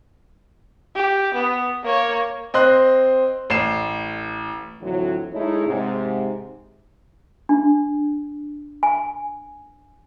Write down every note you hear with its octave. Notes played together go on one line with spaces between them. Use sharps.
G4
B3
A#3 C#5
C4 D#5 C6 F#6
A1 C7 E7
F2 A2 D3 E3 F#3
G#3 A3 D#4 E4 G#4 C#5
G#2 C3
D4
G#5